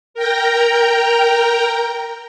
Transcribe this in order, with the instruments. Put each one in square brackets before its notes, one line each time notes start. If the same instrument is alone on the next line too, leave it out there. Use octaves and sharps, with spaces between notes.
[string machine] A#4 G5 A#5